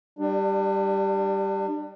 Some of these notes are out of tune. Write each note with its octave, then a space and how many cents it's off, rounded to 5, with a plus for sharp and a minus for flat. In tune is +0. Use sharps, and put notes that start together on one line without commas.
G3 +0 D4 +30